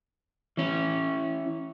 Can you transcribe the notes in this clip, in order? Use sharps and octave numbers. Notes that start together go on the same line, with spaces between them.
E3 C#4